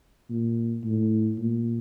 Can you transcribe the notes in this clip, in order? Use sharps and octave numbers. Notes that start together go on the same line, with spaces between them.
A#2
A2
A#2